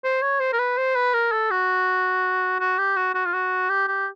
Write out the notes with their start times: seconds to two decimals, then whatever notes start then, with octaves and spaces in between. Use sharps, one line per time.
0.04 C5
0.22 C#5
0.40 C5
0.53 A#4
0.59 B4
0.77 C5
0.95 B4
1.14 A#4
1.32 A4
1.51 F#4
2.60 F#4
2.79 G4
2.97 F#4
3.15 F#4
3.26 F4
3.34 F#4
3.70 G4
3.88 G4